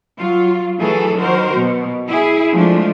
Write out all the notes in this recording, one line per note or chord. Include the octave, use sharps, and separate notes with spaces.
F#3 F4
E3 F#3 A3 G#4 A4
D#3 F#3 F#4 A#4 C5
B2
E4 G#4
F3 G#3 A3 D4